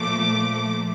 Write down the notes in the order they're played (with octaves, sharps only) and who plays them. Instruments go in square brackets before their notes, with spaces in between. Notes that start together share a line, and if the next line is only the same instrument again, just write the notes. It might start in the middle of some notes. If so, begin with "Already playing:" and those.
Already playing: [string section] A#2 F3 A3 D6